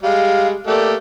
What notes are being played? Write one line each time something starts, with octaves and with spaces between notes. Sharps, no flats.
G3 G#3 F5
A3 A#3 G4 D5